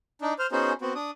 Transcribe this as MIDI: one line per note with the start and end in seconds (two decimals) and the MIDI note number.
0.22 0.34 62
0.22 0.34 63
0.39 0.47 72
0.39 0.47 89
0.52 0.73 59
0.52 0.73 61
0.52 0.73 63
0.52 0.73 66
0.52 0.73 68
0.52 0.73 72
0.82 0.93 59
0.82 0.93 60
0.82 0.93 66
0.95 1.11 62
0.95 1.11 87